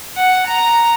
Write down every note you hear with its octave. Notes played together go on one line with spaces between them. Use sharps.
F#5
A#5